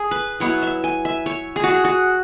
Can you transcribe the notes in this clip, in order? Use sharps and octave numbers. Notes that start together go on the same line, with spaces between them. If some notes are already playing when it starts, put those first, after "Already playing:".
Already playing: G#4
B4
F#3 B3 E4 C#5
E5
G#5
E5
C#5
G#4
F#4
G#4
F#4